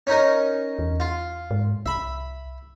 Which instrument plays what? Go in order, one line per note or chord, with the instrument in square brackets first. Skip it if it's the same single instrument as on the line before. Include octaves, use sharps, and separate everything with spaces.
[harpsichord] C#4 D#4 A#4
[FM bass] E2
[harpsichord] F4
[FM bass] G#2
[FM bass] C2 [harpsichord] E5 B5